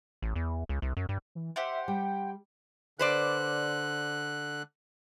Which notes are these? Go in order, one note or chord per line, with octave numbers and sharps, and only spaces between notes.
A1
E2
C#2
C2
F#2
G2
E3
G4 C5 E5 F#5
G3 G5
D3 B4 C5 D5 F#6